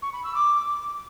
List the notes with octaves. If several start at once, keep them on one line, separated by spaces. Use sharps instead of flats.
C#6
B5
E6
D6